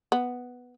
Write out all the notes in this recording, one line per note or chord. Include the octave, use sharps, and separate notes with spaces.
B3